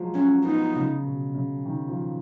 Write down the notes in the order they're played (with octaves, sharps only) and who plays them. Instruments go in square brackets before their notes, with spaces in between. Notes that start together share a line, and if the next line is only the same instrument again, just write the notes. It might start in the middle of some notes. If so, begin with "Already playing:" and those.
Already playing: [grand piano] F3 F#3 G#3
[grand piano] F#3 [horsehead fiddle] C#4
[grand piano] B3 [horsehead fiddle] D#4
[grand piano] C#3
B2
C#3
D#3
F3